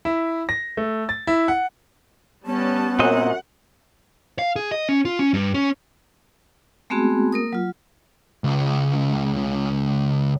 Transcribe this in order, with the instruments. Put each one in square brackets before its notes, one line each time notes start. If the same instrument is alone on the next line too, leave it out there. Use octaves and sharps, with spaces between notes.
[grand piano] E4
A#6
A3
A6
E4
F#5
[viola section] G3 C#4 A5 [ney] B3
[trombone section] F#2 [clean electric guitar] A#2 C4 D#5 [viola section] F#5
[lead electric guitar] F5
G#4
D#5
C#4
F4
C#4
G2
C#4
[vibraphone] G#3 A3 B3 C4 F#4 G#4
A#3 A#4 D#6
F#3 F4
[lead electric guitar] C#2 C#3